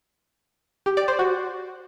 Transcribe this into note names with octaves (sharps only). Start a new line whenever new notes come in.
G4
D5
C5
F#4